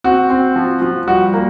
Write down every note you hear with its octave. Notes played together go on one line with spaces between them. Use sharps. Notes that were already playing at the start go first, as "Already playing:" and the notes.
C4 F#4
C4
F3
F3
G3 F#4
A#3